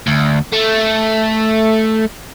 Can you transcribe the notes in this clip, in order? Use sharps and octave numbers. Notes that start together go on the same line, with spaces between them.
D2
A3